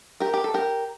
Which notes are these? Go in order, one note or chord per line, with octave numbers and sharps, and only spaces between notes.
G4 A#4
G4
A4
G4 A#4